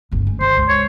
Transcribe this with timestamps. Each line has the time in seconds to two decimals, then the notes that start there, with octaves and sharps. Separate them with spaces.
0.11 G1 C#2
0.27 A3 C#4
0.41 D#3 C5
0.57 C#2
0.69 C#5